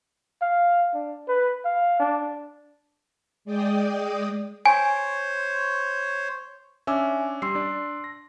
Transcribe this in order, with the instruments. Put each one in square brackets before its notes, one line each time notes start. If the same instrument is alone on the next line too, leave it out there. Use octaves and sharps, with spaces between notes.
[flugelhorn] F5
D4
B4
F5
D4
[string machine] G#3 D5 G5 D#6
[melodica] C5 C#5 [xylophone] G#5
[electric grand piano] C#4 D4 E6 [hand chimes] E5 G#5 D6
[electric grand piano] G3 [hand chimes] C6 E6 C7
[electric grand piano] D4 D5
A#6